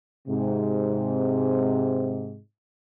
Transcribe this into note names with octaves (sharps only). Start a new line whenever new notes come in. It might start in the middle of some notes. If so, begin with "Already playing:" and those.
G#2 C3